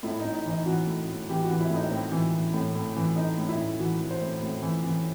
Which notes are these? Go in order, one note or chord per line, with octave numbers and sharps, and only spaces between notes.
A2 E4
A2 D#4
D#4
E3 D#4
E3 F#4
A2
A2
E3 G4
F#4
E3
E4
A2 D#4
A2 C4
E3
E3
A2
A2
E3
E3 D#4
A2
E4
A2
E3 F#4
E3
C5
A2
A2
E3
E3